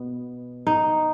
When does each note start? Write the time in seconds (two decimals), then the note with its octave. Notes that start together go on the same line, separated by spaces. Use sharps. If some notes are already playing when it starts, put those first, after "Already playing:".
Already playing: B2 B3
0.67 D#4